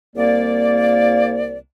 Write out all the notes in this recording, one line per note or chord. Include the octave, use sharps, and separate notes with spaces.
C2 A#3 D5